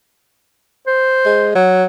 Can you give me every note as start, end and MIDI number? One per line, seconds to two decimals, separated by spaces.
0.87 1.52 72
1.26 1.55 56
1.55 1.86 54